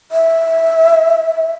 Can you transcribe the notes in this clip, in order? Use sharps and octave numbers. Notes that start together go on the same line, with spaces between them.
E5